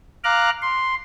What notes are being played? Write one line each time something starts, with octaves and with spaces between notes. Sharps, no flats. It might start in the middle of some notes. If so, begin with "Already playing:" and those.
F5 A#5 D6 F6 F#6
C6